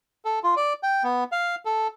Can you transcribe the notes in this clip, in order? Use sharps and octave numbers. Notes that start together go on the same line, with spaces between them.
A4
F4
D5
G5
B3
F5
A4